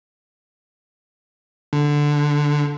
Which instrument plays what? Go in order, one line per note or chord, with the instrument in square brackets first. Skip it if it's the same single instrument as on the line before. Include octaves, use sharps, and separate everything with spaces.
[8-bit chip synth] D3